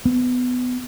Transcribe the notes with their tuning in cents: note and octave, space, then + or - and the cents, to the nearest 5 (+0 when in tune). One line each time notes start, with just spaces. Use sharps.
B3 +20